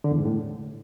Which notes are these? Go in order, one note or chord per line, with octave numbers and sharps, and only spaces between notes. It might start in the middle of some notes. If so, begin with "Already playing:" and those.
D3
E2
G#2
A2